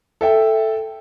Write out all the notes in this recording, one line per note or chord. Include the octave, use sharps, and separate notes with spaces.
A4 E5 G5